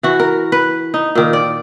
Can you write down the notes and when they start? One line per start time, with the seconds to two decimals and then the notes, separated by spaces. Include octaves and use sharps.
0.03 E3 F#4
0.20 A#4
0.52 B4
0.94 D#4
1.15 A#2 D#3
1.33 D5